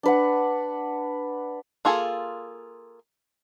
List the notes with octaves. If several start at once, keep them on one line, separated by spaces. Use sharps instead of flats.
D4 B4 F#5
A#3 F4 G#4 A4